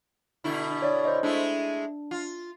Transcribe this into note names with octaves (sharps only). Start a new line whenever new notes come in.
B2 D3 E4
C#5 D5
C5 D#5
G#3 A3 D4 E4
F4